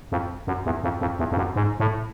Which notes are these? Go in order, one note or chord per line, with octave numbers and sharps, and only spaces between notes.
F2
F#2
E2
F2
F2
E2
F2
F#2
G#2
A2